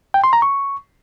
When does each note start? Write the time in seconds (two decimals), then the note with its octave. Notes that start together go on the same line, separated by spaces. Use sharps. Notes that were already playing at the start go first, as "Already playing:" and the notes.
0.14 G5
0.24 C6
0.33 A#5
0.42 C#6